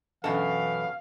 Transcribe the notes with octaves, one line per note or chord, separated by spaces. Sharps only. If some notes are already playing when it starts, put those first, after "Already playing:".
F#2 B2 E3 A4 F5